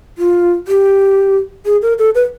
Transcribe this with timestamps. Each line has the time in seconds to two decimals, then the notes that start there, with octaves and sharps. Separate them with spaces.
0.18 F4
0.68 G4
1.65 G#4
1.82 A#4
1.99 A4
2.15 B4